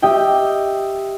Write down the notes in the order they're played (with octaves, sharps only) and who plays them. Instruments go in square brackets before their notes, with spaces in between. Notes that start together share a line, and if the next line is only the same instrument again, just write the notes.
[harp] G4 D#5 E5 G5